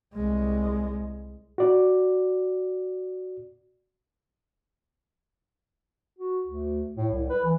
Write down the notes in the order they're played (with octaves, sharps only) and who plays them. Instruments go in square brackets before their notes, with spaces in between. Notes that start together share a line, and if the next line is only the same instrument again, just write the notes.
[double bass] C2 G#3
[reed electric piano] F#4 D5
[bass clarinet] F#4
D2
A2
C2
B4
E3